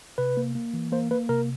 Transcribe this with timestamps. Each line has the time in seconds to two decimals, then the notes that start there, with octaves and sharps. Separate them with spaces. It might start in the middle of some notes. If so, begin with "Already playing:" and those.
0.18 C3 B4
0.37 A#3
0.55 A#3
0.74 E3
0.92 A#3 C5
1.11 A#3 B4
1.29 C3 A#4